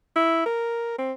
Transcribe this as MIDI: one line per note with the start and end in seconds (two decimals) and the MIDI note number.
0.16 0.45 64
0.46 0.94 70
0.99 1.12 60